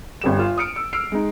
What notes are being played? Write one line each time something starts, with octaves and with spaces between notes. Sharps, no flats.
G1 G3 E7
F4
D#6 F6 C#7 D7
E6
E6 F6 C7 D7
G#3 D#4